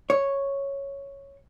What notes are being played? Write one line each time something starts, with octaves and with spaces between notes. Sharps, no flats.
C#5